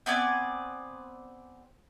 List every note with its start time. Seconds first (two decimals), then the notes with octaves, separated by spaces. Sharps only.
0.06 B3 C4 D5 G#5